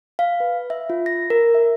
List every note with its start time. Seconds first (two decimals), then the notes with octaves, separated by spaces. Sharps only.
0.19 F5
0.40 B4
0.70 E5
0.90 F4
1.06 A#6
1.30 A#4
1.55 E5